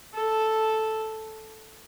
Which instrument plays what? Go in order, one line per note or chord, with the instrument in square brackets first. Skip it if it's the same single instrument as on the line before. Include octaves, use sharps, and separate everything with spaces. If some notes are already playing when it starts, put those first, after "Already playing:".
[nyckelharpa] A4